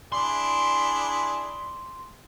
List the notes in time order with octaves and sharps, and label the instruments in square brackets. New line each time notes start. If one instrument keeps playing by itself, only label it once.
[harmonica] D4 E4 G#4 [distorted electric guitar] C6